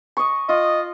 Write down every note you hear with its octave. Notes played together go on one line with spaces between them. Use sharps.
D#5 C#6
F4 D#5